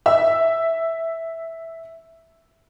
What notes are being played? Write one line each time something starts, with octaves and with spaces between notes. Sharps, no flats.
E5 E6